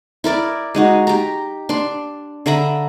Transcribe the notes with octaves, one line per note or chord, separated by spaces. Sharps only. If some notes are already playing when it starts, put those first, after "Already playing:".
E4 A#4 D5 D6
G#3 D#4 F#4
G4 A#5
D4 C6
D3 E5 A#5 B5